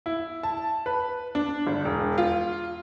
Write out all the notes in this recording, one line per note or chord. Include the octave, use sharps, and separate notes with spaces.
E4
A5
B4
D4
G1
E1
F4